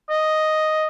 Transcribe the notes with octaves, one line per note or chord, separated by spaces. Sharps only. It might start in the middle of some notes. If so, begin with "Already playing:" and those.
D#5